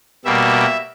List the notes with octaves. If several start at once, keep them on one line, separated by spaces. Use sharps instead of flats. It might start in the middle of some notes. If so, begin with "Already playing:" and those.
B2 G3 A#3 E5